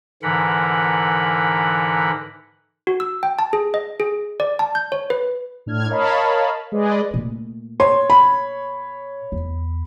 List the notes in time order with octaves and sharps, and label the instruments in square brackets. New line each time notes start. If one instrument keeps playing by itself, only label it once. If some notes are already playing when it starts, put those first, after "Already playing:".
[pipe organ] G#2 D3 E3 A#4 F#5 B5
[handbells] F#4
E6
G5
A5
G#4
D#5
G#4
D5
A5
G6
C#5
B4
[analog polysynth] A2 D4 F6 G#6
A#4 C#5 D#5 F5 A5 B5
G#3 G#4 B4 D5 D#5
[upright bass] A#2 A3
[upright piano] C#5 [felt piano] C6
[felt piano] B5
[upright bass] E2